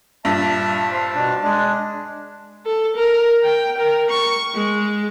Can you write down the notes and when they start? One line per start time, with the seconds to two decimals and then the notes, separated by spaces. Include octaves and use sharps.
0.25 G2 A#2 E5 A5
0.91 C5
1.15 B2 D4
1.43 G#3 D4
2.66 A4
2.96 A#4
3.44 G5
3.78 A#4
4.10 C#6
4.54 G#3